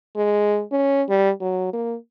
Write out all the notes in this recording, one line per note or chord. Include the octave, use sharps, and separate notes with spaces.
G#3
C#4
G3
F#3
A#3